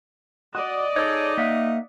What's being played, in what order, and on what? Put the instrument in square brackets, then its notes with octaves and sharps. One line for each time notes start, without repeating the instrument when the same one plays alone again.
[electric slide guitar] F#4 [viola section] D5 D#5
[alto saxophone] D#4 [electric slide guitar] G#4 A4 C#5
[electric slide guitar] A#3 E5 F#5